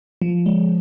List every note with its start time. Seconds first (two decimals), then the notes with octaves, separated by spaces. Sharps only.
0.22 F3
0.46 G#3